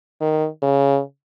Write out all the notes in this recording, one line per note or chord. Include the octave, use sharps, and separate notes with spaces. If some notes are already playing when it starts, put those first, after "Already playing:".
D#3
C#3